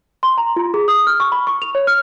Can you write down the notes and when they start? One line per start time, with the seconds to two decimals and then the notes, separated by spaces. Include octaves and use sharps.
0.23 C6
0.38 A#5
0.56 F4
0.74 G#4
0.88 D#6
1.07 F6
1.20 C#6
1.32 B5
1.47 C#6
1.62 F7
1.75 C#5
1.87 F6